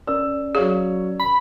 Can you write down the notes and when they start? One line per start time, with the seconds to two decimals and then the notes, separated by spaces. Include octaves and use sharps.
0.07 C#4 A#4 D5 E6
0.55 F#3 G#4 C#5 F5
1.20 B5